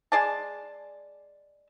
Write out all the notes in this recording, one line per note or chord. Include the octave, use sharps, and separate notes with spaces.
G#3 G#4 D5 A5